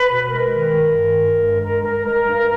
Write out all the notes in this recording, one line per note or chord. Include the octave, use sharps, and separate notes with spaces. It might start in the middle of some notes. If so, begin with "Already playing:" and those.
Already playing: B4
B2
G#3 A#4
D#3
G2
D#3
G2
G#3
G2 A#4
G#3 A#4
G#3 A#4
G2